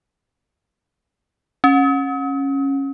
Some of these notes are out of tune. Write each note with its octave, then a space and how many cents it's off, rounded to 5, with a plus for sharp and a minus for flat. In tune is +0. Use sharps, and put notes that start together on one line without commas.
C#4 -15